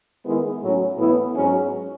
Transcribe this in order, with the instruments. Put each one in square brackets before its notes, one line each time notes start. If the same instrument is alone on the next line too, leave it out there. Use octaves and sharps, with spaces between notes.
[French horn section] D#3 G#3 B3 E4
A2 F#3 C#4
A2 E3 B3 E4
G#2 F#3 C#4